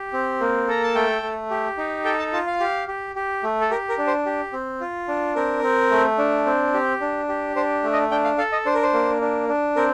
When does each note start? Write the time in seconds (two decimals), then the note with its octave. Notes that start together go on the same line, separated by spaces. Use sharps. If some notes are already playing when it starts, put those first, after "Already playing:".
Already playing: G4
0.13 C4
0.40 A#3
0.68 A4 A#5
0.83 A5
0.95 A3 G5
1.23 A3
1.51 G4
1.78 D#4
2.05 A4 G5
2.19 A5
2.33 F4 A5
2.47 F5
2.60 G4
2.88 G4
3.16 G4
3.43 A3
3.61 A4
3.70 G4 A#4
3.89 A#4
3.98 D4
4.07 C5
4.26 G4
4.53 C4
4.81 F4
5.08 D4
5.36 C4 A#4
5.63 C4
5.91 A3
6.18 D4
6.46 C4
6.74 G4
7.01 D4
7.29 G4
7.56 D4 C5
7.83 A3
7.93 D#5
8.11 D4 G5
8.24 F5
8.38 A4 F5
8.52 D#5
8.66 D4 C5
8.74 A#4
8.83 C5
8.93 A#3
9.21 D4
9.48 D4
9.76 C4 A#4